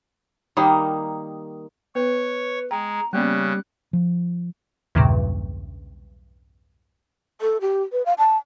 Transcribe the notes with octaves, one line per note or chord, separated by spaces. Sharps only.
D#3 G3 A#3 D#4
B3 B4 C#5
G#3 G5 A#5
C#3 G3 A#3 B3 C#4 F#6
F3
B1 E2 G2 A#2 C#3
A4
G4
B4
F5
A5